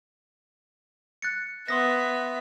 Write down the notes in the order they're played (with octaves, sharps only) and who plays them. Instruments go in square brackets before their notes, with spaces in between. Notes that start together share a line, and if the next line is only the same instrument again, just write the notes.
[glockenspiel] F#6 A6 C#7
[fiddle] B3 E5 [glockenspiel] C6 D#6 A#6